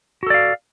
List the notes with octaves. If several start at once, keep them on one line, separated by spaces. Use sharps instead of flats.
F#4 A4 D5 F5